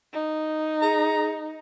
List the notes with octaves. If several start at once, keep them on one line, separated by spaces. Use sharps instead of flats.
D#4
G#4 A#5